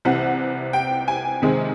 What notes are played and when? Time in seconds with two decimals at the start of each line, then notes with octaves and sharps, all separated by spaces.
0.05 C2 C3 E3 F#5
0.73 G5
1.08 G#5
1.42 C3 D#3 G#3 C4